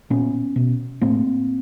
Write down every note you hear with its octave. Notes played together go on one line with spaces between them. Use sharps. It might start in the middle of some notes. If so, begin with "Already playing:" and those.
A#2 B3 C#4
B2
A2 A#3 C4